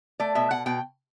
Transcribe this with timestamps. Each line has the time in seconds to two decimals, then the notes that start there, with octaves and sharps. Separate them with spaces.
0.20 A3 D5
0.35 B2 E5
0.50 B2 F#5
0.66 B2 G5